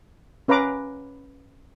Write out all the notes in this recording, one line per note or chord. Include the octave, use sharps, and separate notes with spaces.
C#4 B4 F5 A#5 D6